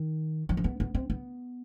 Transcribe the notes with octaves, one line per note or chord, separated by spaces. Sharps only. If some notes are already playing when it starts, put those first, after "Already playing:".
Already playing: D#3
F3
C4
B3
B3
C4
B3